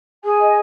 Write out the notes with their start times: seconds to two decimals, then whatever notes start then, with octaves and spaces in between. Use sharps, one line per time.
0.24 G#4 G#5
0.40 D#5